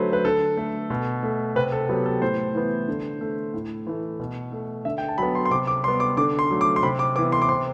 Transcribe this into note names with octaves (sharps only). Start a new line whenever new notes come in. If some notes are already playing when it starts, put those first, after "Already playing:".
Already playing: D3 F#3 A3 B4 C5
B4
D3 A4
A3
B2
A3
C3 B4
A4
F#3 B3 G4
A4
A2 C5
E3 B3
D3
A3
A2
E3 A3
B2
A3
D3 E5
G5
A5
F#3 B3 B5
C6
C6
C3 D6
D6
G3 B3 C6
D6
D3 D6
C6
F#3 A3
D6
C6
C3 B5
D6
E3 B3 D6
C6
D6
C3 C6